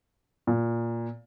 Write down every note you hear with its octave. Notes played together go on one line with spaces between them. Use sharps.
A#2